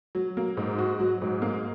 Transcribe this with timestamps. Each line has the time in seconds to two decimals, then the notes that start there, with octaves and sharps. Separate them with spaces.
0.15 F#3
0.37 A#3
0.57 G#2
0.78 F#4
1.00 F#3
1.22 G#2
1.42 A#3